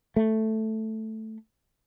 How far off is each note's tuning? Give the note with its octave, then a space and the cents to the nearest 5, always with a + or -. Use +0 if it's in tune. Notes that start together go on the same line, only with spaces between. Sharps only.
A3 +0